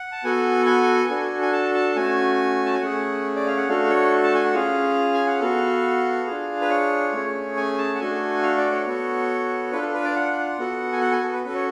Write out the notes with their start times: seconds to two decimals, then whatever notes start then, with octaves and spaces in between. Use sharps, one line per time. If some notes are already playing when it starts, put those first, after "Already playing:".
Already playing: F#5
0.12 A5
0.24 B3 F#4 A4 G#5
0.66 G#5
1.10 D4 F#4 A4
1.42 G#5
1.52 A5
1.74 A5
1.96 A3 C#4 F#4 G#5
2.66 A5
2.74 G#5
2.82 A3 C#4 G#4 F#5
3.36 D5
3.46 F5
3.57 F#5
3.68 A3 D4 F#4 A4 F5
3.90 C#5
4.24 A5
4.35 G#5
4.45 F#5
4.54 C#4 F4 G#4 F5
5.14 G#5
5.27 F#5
5.40 B3 F#4 A4 F5
6.27 D4 F4 G#4
6.61 B4
6.70 C#5
7.13 A3 C#4 G#4
7.57 G#5
7.78 A5
7.95 F#5
8.00 A3 D4 F#4 A4 G#5
8.43 F5
8.58 D5
8.72 C#5
8.86 B3 F#4 A4
9.72 D4 F4 A4 B4
9.82 A4
9.94 B4
10.04 D5
10.16 F#5
10.59 B3 F#4 A4
10.92 G#5
11.01 F#5
11.12 G#5
11.23 A4
11.33 B4
11.44 C#4 F#4 A4 B4
11.55 C#5